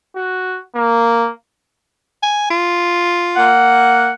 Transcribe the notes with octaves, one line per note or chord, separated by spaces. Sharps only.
F#4
A#3
G#5
F4
A#3 F#5